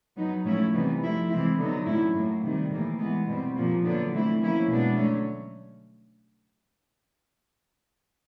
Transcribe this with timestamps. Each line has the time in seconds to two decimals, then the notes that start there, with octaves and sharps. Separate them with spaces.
0.17 F#3 B3 D#4
0.45 A2 F3 A3 C#4 E4
0.73 C3 E3 G3 B3 D#4
1.01 F3 A3 C4 E4
1.29 C3 E3 G#3 C4 E4
1.58 D3 F#3 B3 D#4
1.85 A2 F#3 A3 C#4 E4
2.14 A2 F#3 A#3
2.43 C3 D#3 G3
2.70 A2 E3 G3 A#3
2.98 E3 G#3 B3
3.27 B2 G3 C4
3.55 A#2 F3 A#3
3.84 D3 F#3 B3 D4
4.12 E3 A3 C4 E4
4.40 F3 A#3 C#4 E4
4.68 B2 G#3 B3 D4
4.96 D3 F#3 A3 C#4